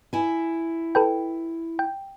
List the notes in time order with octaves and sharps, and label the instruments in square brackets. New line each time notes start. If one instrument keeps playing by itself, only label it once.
[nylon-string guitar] E4 G#5
[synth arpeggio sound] A4 B4 G5
G5